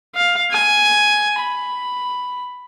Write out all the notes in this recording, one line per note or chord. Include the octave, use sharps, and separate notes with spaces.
F5
G#5
B5